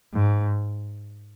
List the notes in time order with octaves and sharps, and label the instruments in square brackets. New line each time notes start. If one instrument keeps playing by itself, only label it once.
[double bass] G#2